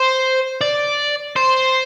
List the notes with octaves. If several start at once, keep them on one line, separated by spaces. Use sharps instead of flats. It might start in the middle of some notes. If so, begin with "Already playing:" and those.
Already playing: C5
D5
C5